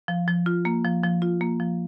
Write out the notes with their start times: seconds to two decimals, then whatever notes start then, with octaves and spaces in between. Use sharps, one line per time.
0.08 F3
0.28 F3
0.46 F4
0.65 A#3
0.85 F3
1.03 F3
1.22 F4
1.41 A#3
1.60 F3